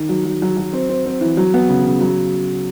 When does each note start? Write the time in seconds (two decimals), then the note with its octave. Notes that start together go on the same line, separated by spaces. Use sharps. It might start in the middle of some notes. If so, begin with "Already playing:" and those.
Already playing: D#3
0.09 F#3
0.25 F#3
0.42 F#3
0.57 F#3
0.73 C4
0.89 C4
1.06 C4
1.21 E3
1.37 F#3
1.54 B3
1.69 C#3
1.86 C#3
2.01 F#3